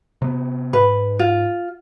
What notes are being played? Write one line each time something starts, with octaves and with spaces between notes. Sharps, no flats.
C3 B3
G#2 B4
F4